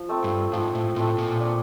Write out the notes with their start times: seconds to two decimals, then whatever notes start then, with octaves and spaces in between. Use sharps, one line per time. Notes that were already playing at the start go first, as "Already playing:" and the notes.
Already playing: F3
0.09 A3 C4
0.24 G2
0.53 G#2 F3
0.75 A2
0.96 A2 A3 C4
1.18 A#2
1.40 D4